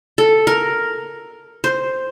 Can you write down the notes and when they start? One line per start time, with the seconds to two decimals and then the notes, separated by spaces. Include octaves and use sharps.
0.18 A4
0.47 A#4
1.64 C5